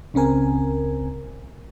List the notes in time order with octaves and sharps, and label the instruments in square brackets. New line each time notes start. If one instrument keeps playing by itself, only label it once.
[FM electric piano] C#2 C#3 C4 A#4 G#5